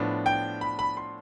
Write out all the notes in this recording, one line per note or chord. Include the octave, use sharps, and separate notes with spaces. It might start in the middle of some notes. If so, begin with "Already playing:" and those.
Already playing: A2 F3 B3 D4
G5
B5
B5
C6